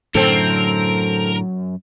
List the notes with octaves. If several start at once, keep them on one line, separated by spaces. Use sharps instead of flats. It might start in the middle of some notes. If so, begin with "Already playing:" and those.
F#2 A2 D3 C4 A4 A#4